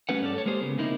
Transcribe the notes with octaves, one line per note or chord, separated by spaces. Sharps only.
G3 A3 C#4 B4 F#5
G2 C#4 A4 D5
A4 C#5
G#3 A#3 G4 G#4 C5
C#2 C#3 B3
C3 F3 A#3 D#4 E4